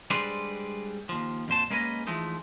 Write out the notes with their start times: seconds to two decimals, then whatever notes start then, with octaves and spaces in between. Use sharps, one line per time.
0.10 G3 G#3 D4 B4 C5 D5
1.09 D#2 F3
1.48 F2 A#2 C5 A5
1.70 G#3 A#3 C#4 B4 D#5
2.07 E3 F3 G#3 A3 D#4